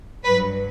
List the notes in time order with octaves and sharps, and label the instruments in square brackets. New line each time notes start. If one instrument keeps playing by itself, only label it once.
[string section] G2 F#3 B4